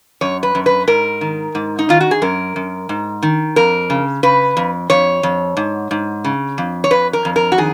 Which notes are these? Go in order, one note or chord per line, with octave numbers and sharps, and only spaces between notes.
F#2 C#5
B4
F#2
B4
G#2 A#4
D#3
G#2
D#4
D#3 F4
F#4
G#4
F#2 A#4
F#2
G#2
D#3
F2 A#4
C#3
C#3 B4
F2
F2 C#5
F2
G#2
G#2
C#3
F2
C#5
F2 B4
A#4
F2
A#4
F#4
D#3 G#4